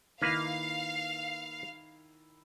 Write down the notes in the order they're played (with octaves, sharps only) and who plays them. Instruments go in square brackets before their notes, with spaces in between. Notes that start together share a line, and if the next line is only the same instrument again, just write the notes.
[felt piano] D#3 E4 A#6 [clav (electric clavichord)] A#3 B4 [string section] F5